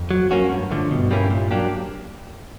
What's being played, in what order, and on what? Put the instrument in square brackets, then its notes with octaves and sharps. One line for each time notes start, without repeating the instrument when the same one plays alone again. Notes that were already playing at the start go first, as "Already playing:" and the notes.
Already playing: [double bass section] F2
[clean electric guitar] F#3
A#3 C#4 F#4
G2
D3 F3 A3
[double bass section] G2 [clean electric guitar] B2
[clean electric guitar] G3 A#3 C#4 E4
A#2
F#3 A#3 D4 G4